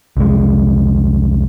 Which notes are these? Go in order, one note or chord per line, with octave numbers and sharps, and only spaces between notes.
C2 F2 G#3